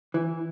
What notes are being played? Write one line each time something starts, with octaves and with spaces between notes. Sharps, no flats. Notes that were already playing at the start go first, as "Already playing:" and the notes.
E3